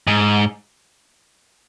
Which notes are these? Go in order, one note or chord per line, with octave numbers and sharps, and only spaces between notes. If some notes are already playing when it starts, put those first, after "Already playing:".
G#2